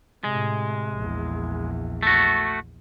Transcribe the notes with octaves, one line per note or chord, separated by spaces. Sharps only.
A2 C3 G#3
A#1 E2
A3 F#4